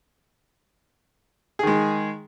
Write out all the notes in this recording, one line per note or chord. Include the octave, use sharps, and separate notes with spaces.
D#3 G#3 G#4